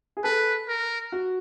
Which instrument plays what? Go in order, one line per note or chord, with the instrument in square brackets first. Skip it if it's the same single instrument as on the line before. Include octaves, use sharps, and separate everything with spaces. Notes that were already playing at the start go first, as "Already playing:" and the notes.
[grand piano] G#4
[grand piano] A4 [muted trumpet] B4
[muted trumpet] A#4
[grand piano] F#4